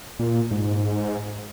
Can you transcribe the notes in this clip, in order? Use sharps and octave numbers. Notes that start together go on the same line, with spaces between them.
A#2
G#2